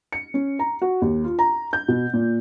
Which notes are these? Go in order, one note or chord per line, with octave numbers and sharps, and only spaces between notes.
C#7
C#4
A#5
F#4
D#2
F4
A#5
G6
B2
A#2